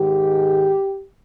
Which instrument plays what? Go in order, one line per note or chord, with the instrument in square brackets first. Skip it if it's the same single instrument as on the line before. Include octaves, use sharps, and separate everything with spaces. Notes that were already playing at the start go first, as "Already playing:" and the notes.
Already playing: [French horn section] G#2 D#3 G#3 G4